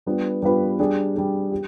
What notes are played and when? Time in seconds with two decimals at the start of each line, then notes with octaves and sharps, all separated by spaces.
0.06 G3 B3 D4 F4 B4
0.42 G3 B3 D4 F4 B4
0.79 G3 D4 G#4
1.15 G3 D4 G#4
1.51 G4